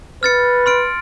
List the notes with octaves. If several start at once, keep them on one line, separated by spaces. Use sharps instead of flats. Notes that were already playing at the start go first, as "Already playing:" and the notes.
B4 F6 A6 C#7
C6 F6 D7